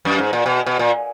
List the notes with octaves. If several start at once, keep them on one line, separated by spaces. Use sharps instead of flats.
F#2
G#2
A#2
B2
B2
A#2